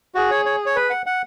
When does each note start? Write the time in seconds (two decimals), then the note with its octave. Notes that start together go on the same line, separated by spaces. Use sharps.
0.15 F#4 G#4
0.30 C#5
0.45 C#5
0.66 C#5
0.76 B4
0.90 F#5
1.06 F#5